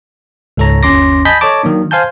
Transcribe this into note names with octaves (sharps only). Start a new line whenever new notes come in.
C#2 G#2 A4 C#5 A#5
G1 D#2 C#4 C6 D6 A#6
D#5 G#5 A5 B5 G6 B6
A4 C#5 D#5 A5 D6
D#3 F#3 A#3 D4
C5 F5 G#5 A5 G6